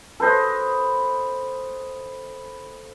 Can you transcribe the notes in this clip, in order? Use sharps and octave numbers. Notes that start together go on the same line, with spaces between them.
A4 B4 C5 D#5